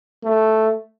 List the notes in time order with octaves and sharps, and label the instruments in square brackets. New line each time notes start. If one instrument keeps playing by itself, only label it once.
[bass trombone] A3